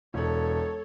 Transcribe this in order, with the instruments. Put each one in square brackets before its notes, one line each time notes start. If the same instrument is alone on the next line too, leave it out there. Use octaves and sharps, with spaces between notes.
[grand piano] E1 [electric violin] A4 C#5